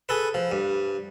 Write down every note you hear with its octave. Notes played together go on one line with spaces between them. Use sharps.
G#4 A4 B4
F3
G2